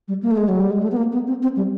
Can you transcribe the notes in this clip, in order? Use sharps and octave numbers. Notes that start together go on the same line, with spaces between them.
G3
A#3
A3
G#3
F#3
G3
G#3
A3
B3
A#3
B3
C4
C4
G3